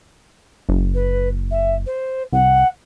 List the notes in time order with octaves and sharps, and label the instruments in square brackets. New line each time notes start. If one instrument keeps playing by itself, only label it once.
[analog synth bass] F#1
[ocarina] B4
E5
C5
[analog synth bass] C2 [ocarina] F#5